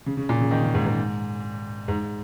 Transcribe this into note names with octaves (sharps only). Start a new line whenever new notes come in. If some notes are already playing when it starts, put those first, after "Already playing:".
C#3
C#3
A#2
C#3
D#3
C#3
G#2
G#2
G#2